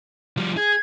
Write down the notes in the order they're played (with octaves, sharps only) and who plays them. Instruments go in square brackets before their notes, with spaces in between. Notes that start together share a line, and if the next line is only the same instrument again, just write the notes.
[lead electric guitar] F3 G3
[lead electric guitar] G#4 [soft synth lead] G#6